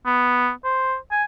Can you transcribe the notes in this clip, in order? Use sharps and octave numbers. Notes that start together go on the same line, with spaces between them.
B3
C5
G#5